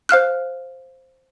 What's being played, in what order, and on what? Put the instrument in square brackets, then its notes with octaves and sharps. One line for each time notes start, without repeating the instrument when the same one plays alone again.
[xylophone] C5 F5 F6 F#6